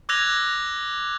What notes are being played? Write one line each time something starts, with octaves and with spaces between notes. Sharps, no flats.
D6 E6 F#6 G#6 A#6 F7